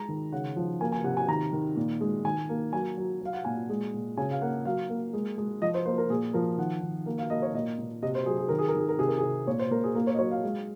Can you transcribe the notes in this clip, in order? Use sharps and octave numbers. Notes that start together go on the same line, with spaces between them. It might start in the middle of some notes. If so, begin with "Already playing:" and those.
Already playing: G#3 A#5
D#3
C#3 F#5
F3
A#3 G#5
G#5
C3 F#5
G#5
D#3 A#5
D#3
A#2
G#3
D#3 G#5
A#3
F#3 G#5
F#3
F#3 F5
F#5
A#2 G#5
G#3
A#2
C#3 G#5
F5
A#3 F#5
F#3 F5
A#3
G#3
G#3
F3 D#5
C5
A#3 C5
A#4
A#2 G#4
F3 A#4
D#3 F#5
D#3
A#3
F5
A#3 D#5
C#5
A#2 D#5
A#2
C3 D#5
C5
F#3 G#4
G#4
D#3 A#4
G#4
A#4
D#3 G#4
A#4
C3 G#4
A#4
G#4
C3
A#2 C#5
C5
A#2 A#4
G#4
A#3 A#4
C#5
D#5
F#3 C#5
F5
G#3